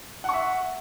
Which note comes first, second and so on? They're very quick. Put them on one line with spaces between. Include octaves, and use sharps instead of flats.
F#5 C#6 E5